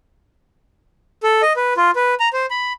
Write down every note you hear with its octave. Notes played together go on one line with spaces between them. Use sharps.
A4
D#5
B4
F4
B4
A#5
C5
B5